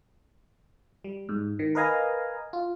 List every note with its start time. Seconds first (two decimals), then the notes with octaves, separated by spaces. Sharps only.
1.04 G3
1.29 G#2
1.59 D#3
1.75 A#4 B4 D#5 F5 G#5 A#5
2.53 F4